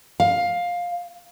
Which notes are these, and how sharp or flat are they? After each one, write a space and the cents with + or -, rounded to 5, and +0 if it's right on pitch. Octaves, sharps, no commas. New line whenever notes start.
F5 +10